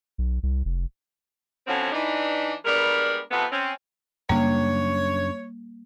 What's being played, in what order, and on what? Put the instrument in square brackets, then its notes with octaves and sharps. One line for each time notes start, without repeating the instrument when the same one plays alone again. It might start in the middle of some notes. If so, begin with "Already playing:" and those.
[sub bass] B1
C2
F1
[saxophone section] B2 D3 F3 F#3 C4 C#4
E3 D4 D#4
G3 G#3 B3 D4 A#4
C3 F3 A3 B3
C4 C#4
[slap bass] F#2 C#3 D4 [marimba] G3 A#3 [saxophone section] C#5